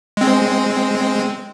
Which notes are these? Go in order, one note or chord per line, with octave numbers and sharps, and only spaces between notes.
G#3 C4